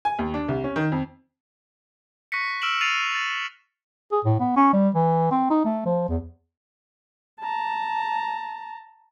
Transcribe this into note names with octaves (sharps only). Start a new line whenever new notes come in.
G#5
D#2
D4
C2
C#4
D#3
F2
C#6 F#6 A#6 B6 C#7
E6 F6 D7 E7 F#7
A6 C7 C#7 D#7 F7
A6
G#4
A2
B3
C#4
G3
E3
C4
D#4
A3
F3
E2
A5 A#5